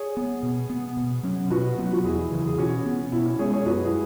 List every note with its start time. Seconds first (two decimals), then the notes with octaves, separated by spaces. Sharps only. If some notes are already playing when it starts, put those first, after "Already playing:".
Already playing: G#4 C#5
0.17 B3
0.43 B2
0.70 B3
0.97 B2
1.23 F#3 C#4
1.50 B2 F#4 B4
1.78 F#3 B3
1.93 F#4
2.04 E2 E4 G#4
2.32 C#3 E3
2.47 G#4
2.58 B2 C#4 F#4
2.86 B3
3.12 B2 E4
3.26 C#4
3.39 G#3 B3 G#4 C#5
3.53 G#4 C#5
3.66 F#2 F#4 B4
3.84 E4 G#4